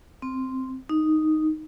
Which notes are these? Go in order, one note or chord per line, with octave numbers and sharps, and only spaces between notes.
C4
D#4